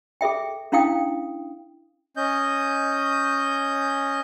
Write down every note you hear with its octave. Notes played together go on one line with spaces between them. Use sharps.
G#4 A4 E5 G5
C#4 D4 E4 F5 G5 D#6
C#4 D#5 G6